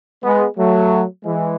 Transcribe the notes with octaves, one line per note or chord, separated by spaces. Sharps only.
G#3 B3
F#3 A3
E3 G#3